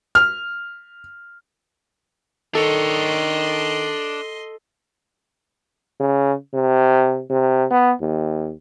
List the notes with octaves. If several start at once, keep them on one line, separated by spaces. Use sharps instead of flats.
F6
D#3 D4 A4 C#5 D#5 C6
C#3
C3
C3
B3
D#2